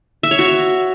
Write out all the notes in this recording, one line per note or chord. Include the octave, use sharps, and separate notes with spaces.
E5
C#5
F#4